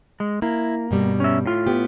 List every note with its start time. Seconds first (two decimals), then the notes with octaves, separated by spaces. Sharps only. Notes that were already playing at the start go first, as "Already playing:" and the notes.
0.20 G#3
0.42 A#3 E4
0.91 G2 B2 G3
1.20 C#4 E5
1.46 A2 F4
1.67 B3 G4